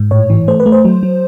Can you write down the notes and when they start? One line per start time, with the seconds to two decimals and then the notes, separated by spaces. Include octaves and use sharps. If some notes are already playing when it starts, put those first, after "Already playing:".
Already playing: G#2
0.11 A2 C#5
0.30 E3
0.48 A3 C5
0.60 B4
0.66 A3
0.72 C5
0.85 F#3
1.03 F#3